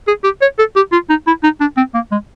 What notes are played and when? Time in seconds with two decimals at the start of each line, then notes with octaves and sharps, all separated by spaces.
0.08 G#4
0.24 G4
0.41 C#5
0.59 A4
0.76 G4
0.92 F4
1.10 D#4
1.27 E4
1.43 D#4
1.60 D4
1.77 C4
1.94 A#3
2.12 G#3